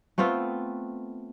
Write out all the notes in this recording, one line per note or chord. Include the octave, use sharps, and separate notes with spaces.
A3 B3 C4 F4